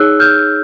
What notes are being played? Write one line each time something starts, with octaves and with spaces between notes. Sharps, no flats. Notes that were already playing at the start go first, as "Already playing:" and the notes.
Already playing: D#4 G#4 C#5 E6 F#6
F6 G6